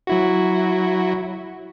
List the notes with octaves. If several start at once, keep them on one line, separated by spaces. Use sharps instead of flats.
F#3 E4 F#4